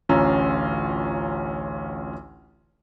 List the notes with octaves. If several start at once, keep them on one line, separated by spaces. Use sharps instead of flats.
A1 D2 C#4 F4 A#5 E6